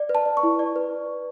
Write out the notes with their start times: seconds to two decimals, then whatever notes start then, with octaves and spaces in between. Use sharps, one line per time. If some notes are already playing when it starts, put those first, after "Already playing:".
Already playing: D5
0.09 B4
0.15 A5
0.25 D5
0.37 C#6
0.43 E4
0.59 D5
0.76 B4